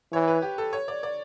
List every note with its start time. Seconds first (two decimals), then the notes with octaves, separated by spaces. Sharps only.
0.12 E3 C#5
0.28 B4
0.42 G4
0.58 A4
0.73 C#5
0.88 D5
1.03 D5